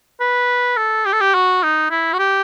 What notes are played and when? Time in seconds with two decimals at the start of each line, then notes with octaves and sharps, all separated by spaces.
0.20 B4
0.77 A4
1.06 G4
1.13 A4
1.21 G4
1.34 F#4
1.63 D#4
1.91 E4
2.13 F#4
2.19 G4